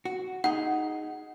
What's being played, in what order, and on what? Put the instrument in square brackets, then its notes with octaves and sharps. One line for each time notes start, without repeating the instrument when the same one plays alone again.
[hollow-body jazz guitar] F#4
[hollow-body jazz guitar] D#4 G#4 [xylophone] F#5